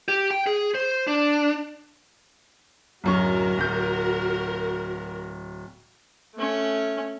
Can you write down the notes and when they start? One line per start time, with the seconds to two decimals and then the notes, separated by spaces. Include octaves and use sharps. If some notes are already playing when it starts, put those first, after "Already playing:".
0.08 G4
0.31 G5
0.47 G#4
0.75 C5
1.07 D4
3.04 D1 F#2 F#4 A#4 C#6
3.58 D1 G6
6.35 A3 C#4